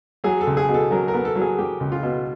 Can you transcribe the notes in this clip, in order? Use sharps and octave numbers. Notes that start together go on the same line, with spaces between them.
F#3 G#4
A4
C#2
G#4
B2
A4
F#3 A#4
A#4
B3
A4
F#3
G#4
F#3 G4
C#2
F4
B2